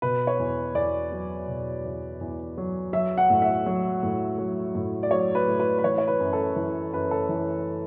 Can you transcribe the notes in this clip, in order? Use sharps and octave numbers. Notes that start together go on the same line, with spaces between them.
B2 B4
C#5
E2
E2 D5
F#3
B2
E2
E2
F#3
F#3 E5
F#5
A2
E5
F#3
A2
F#3
A2
D5
F#3 C#5
B4
A2
B4
B4
E3 C#5
C#5
B4
F#2
A4
E3
F#2 B4
A4
E3